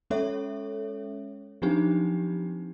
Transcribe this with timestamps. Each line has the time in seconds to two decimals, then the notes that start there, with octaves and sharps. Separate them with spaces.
0.10 G#3 C#4 A4 C#5 E5
1.62 F3 F#3 C4 D4 D#4 G4